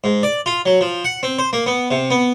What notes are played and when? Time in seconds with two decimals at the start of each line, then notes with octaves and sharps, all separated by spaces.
0.04 G#2
0.23 D5
0.46 F4
0.66 F#3
0.81 F3
1.04 F#5
1.23 C4
1.39 C5
1.53 A#3
1.66 B3
1.91 C3
2.10 B3